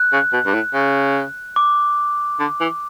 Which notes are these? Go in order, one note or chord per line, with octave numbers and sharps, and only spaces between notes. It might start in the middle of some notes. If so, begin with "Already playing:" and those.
Already playing: F#6
C#3
B2
G2
A2
C#3
D6
D3
E3